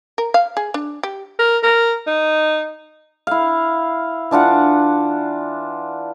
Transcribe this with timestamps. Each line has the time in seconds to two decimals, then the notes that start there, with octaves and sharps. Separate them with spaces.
0.18 A#4
0.34 F5
0.57 G#4
0.74 D4
1.03 G4
1.39 A#4
1.63 A#4
2.07 D#4
3.27 E4 F5
4.31 E3 D4 F4 F#5